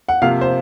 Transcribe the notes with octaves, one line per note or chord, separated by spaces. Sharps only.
F#5
C3 F3 A#3 F5
C5